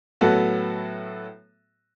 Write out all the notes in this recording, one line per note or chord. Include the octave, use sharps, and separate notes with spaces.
A2 F#3 B3 F#4 A4